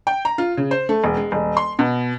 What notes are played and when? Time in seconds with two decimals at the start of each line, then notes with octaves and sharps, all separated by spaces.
0.07 G5
0.25 A#5
0.38 F4
0.57 C#3
0.71 C5
0.89 A3
1.04 E1
1.17 G#3
1.32 D#1
1.57 C6
1.79 B2